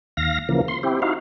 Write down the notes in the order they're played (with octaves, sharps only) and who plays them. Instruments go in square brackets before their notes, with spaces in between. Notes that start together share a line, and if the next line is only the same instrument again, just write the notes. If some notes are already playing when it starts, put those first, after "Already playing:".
[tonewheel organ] D#2 F5 A#6
C#3 E3 F3 A#3
C6
C4 E4 G4
D#4 E4 F#4 F5